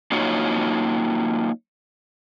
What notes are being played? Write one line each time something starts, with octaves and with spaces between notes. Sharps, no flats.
F#3 A#3 D#4 F4 F#4 C#5